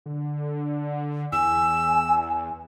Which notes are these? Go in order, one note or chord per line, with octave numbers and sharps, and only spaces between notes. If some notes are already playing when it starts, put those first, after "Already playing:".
D3
E2 G#5 E6